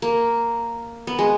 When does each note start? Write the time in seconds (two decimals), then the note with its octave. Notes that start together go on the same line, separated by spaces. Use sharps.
0.02 A#3
1.07 B3
1.19 G#3